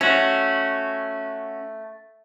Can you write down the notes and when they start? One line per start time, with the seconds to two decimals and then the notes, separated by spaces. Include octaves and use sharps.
0.01 A3 C#4 F#4